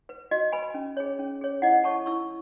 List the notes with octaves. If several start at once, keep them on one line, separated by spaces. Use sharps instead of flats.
B4
F#4 D#5
B4 G#5 B5
C#4
G#4 C#5
C#4
G#4 C#5
E4 D#5 F#5
A4 C#5 A5 C#6
E4 C#6 E6